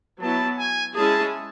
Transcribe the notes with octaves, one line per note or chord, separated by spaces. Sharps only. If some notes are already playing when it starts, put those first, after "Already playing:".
F#3 B3 E4 A5
G#5
G#3 C#4 E4 G#4 A5